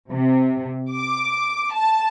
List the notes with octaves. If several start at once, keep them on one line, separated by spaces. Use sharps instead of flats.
C3
D6
A5